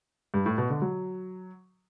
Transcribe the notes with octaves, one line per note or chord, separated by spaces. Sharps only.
G2
A2
B2
D3
F#3